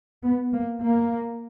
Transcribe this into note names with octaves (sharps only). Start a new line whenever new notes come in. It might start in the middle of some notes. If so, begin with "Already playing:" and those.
B3
A#3
A#3